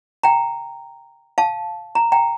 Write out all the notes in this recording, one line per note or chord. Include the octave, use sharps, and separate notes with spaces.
G5 A#5
F5 A5
A#5
G5 A#5